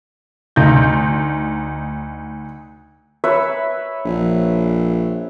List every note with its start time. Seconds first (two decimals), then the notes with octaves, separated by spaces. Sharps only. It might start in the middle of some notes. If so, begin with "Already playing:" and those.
0.56 D2 D#4 G6
3.24 B4 C#5 E5
4.05 A#1